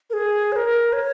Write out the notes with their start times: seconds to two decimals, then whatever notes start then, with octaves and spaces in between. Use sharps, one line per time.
0.10 A#4
0.13 G#4
0.52 C#5
0.56 A#4
0.93 C#5